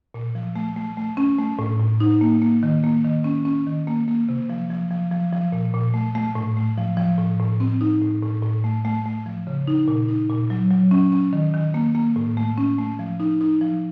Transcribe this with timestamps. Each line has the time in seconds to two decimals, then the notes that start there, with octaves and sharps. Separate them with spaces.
0.14 A#2
0.35 F3
0.56 A3
0.76 A3
0.97 A3
1.17 C#4
1.38 A3
1.59 A2
1.80 A2
2.00 D#4
2.21 A#3
2.42 A#3
2.63 D#3
2.84 A#3
3.04 D#3
3.24 C#4
3.45 C#4
3.66 D#3
3.87 A#3
4.08 A#3
4.29 C3
4.49 F3
4.70 F3
4.91 F3
5.11 F3
5.32 F3
5.52 A#2
5.74 A#2
5.94 A3
6.15 A3
6.35 A2
6.57 A3
6.78 F3
6.97 F3
7.18 A2
7.40 A2
7.60 C4
7.81 D#4
8.02 A2
8.23 A2
8.43 A2
8.64 A3
8.85 A3
9.05 A3
9.26 F3
9.47 C#3
9.68 D#4
9.88 A#2
10.09 D#4
10.30 A#2
10.50 F#3
10.71 F#3
10.91 C#4
11.12 C#4
11.33 D#3
11.54 D#3
11.74 A#3
11.95 A#3
12.16 A2
12.37 A3
12.58 C#4
12.78 A3
12.99 F3
13.20 D#4
13.41 D#4
13.61 F3